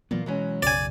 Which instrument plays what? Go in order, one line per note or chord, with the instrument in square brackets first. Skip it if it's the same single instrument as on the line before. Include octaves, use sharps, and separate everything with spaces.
[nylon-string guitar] A#2 A#3 F4 [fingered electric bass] E3 F#3 B3
[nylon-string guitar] B2 F#3 C#4 [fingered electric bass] E3 G#3
[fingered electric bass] B1 F#2 C#3 [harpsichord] D5 G#5